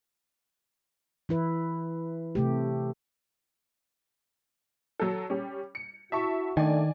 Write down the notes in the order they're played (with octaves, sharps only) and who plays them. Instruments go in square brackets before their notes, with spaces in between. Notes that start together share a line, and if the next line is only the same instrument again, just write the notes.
[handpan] E3 E4 B4
C3 A3 G4
[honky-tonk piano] F#3 A4
G3 C#4
C#7
[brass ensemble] E4 F#4 [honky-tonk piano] E5 A5 C#6
[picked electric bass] D#3 [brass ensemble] A3 D4 [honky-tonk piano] D5 G#5